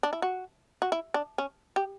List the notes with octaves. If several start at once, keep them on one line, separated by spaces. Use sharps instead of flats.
D4
E4
F#4
F#4
E4
D4
C#4
G4